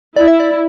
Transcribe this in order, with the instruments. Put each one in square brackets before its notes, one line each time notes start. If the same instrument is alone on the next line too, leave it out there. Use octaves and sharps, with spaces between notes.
[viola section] E4 [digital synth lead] D5
[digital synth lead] E5
D5